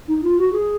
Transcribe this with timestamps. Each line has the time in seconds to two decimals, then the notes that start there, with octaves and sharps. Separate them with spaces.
0.08 D#4
0.23 F4
0.38 F#4
0.53 G#4